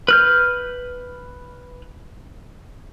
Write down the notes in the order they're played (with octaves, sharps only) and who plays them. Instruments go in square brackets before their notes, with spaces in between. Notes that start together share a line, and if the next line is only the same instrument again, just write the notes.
[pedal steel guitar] B4 F6 G6